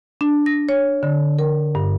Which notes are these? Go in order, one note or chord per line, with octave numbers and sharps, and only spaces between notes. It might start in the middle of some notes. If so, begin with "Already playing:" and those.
D4
A#6
C#5
D3
A#4
G2